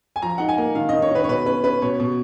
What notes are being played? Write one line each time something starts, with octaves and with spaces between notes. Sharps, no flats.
G#5
F3 A#5
D#4 F#5
G#5
A#3
D#3 F5
D#3 D#5
C#5
D#3 B4
C#5
B2 B4
C#4 B4
C#4 B4
B2 C#5
B2